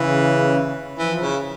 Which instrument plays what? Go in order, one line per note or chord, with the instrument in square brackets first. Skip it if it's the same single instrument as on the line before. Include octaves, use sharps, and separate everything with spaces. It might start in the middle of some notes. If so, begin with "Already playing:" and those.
Already playing: [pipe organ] C#3 [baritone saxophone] E3
[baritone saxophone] E3 [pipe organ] F3
[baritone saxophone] C#3